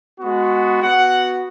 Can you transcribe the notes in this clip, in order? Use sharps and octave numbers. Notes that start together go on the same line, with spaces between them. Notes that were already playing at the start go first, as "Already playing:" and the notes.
G#3 B3 F#4
B3 F#4 F#5